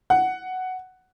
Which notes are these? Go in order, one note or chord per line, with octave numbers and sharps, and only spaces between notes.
F#5